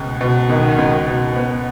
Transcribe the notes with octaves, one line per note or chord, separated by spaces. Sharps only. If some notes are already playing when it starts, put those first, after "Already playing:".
Already playing: C#2 B2
B2
C#2 B2 D#3
C#2
B2
B3